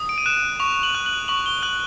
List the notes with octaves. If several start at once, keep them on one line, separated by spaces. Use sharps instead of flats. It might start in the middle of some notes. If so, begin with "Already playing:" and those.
Already playing: D#6
D7
D#7
F#6 E7
C#6 F7
F#7
F#6
F#7
C#6 F#7
G7
F#6 F#7